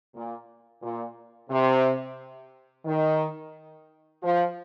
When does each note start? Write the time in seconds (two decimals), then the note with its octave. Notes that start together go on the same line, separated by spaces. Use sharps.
0.14 A#2
0.82 A#2
1.50 C3
2.85 D#3
4.22 F3